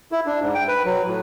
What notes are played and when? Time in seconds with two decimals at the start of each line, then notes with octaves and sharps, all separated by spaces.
0.12 E4
0.26 D4
0.40 G#2
0.55 G5
0.68 B4
0.85 F#3
1.06 A2